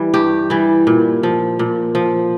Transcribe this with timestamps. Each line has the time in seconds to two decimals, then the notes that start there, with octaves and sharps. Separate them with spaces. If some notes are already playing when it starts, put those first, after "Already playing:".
Already playing: E3 G3
0.14 G2 G4
0.50 E3 G3
0.87 A#2
1.23 F3
1.59 A#2
1.95 F3